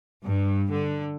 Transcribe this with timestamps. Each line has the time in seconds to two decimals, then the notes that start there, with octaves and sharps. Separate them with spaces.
0.25 G2
0.70 D3